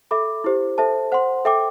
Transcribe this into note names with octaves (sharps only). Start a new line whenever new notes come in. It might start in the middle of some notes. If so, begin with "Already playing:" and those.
A4 E5 B5 D6
E4 G4 C5
A4 C5 E5 A5
C5 F#5 C6
A4 E5 G5 D6